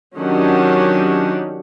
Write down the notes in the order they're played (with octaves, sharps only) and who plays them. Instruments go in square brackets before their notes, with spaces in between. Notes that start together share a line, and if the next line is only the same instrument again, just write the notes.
[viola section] D#3 F#3 C#4 D4 G4 F#5